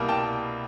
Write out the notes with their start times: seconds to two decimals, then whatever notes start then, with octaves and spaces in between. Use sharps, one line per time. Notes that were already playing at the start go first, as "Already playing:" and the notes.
Already playing: C2 B2 G3 A#3
0.09 G5 A5